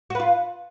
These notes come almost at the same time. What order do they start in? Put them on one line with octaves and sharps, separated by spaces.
F#4 B4 F4